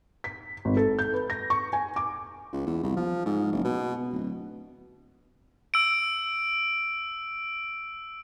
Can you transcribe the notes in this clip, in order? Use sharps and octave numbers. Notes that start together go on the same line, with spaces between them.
B6
G#1
A4
G6
B4
A#6
C#6
G#5
D6
C#2
E2
C2
F3
G#2
F#1
B2
D1
E6 D7